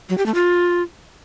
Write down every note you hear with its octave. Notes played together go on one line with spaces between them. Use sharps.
F#3
G4
A3
F4